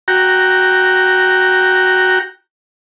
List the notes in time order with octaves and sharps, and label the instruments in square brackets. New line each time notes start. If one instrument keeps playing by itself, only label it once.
[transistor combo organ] F#4 G5 A#5